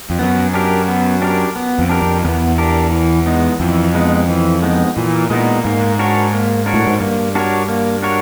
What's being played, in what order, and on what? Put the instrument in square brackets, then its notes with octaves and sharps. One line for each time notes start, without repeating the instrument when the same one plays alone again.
[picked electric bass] F2
[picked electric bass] F#2 [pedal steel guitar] B3
[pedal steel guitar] D4 G4 A#4
B3
D4 G4 A#4
B3
[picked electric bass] F2
[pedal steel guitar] D4 G4 A#4
[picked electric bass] F2
[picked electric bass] E2 [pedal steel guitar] B3
[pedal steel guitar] D4 G4 A#4
E3
G#3 B3 D#4
[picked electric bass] F2 [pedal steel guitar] E3
[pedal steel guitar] G#3 B3 D#4
E3
G#3 B3 D#4
[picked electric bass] A#2 [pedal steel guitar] E3
[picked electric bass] A#2 [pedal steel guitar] G#3 B3 D#4
[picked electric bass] G#2 [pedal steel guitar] A#3
[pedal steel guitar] D4 F#4 A#4 C#5
A#3
D4 F#4 A#4 C#5
[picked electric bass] A2
G#2
[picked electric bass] G2 [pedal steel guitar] A#3
[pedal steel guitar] D4 F#4 A#4 C#5
A#3
D4 F#4 A#4 C#5